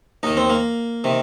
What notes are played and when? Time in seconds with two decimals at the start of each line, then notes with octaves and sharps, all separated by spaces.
0.23 D#2 D#3 D#4
0.37 C4
0.50 A#3
1.04 C3 D#3